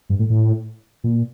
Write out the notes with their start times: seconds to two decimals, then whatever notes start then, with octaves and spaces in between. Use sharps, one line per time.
0.10 G2
0.19 A2
0.30 A2
1.04 A#2